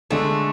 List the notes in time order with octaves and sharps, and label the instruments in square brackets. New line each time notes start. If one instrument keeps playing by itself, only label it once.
[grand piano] D3 G#3 D4 [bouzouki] A3